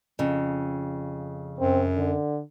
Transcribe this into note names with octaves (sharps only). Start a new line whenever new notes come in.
F2 C#3
F#2 C4
D3